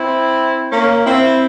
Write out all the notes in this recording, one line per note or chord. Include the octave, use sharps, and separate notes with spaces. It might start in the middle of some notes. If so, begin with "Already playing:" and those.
Already playing: C4 E4
A#3 C#4
C4 E4